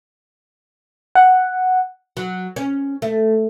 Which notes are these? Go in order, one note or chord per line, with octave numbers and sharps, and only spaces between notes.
F#5
F#3
C#4
A3